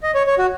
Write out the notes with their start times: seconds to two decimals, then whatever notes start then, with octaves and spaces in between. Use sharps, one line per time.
0.03 D#5
0.15 C#5
0.27 C#5
0.38 F#4